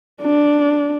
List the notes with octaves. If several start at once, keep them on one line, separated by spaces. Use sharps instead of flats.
D4